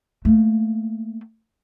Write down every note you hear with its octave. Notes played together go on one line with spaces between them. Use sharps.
A3 A#3